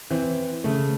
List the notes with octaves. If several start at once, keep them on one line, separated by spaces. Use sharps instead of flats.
E3 C4
C#3 A3